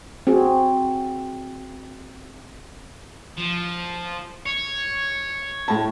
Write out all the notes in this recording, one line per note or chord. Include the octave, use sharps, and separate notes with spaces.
C4 F#4 G#4
F3
C#5
A2 A5